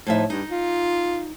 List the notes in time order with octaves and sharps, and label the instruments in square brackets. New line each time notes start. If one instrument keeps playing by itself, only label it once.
[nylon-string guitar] A2 F3 E5 [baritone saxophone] D#4
[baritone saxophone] G2 [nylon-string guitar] D#4
[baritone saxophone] F4